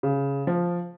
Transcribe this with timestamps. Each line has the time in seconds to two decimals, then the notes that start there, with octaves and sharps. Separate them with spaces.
0.03 C#3
0.47 F3